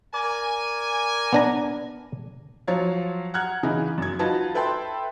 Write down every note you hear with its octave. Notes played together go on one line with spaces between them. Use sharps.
A#4 D5 G#5
B3 D4 A#5
F3 F#3 C#5 F5
F#5 A#5 F6 F#6 G#6
C#3 E3 D#4
F#2 G#6
D#4 F4 F#4 B4 A5
A4 B4 E5 G5 A5 C6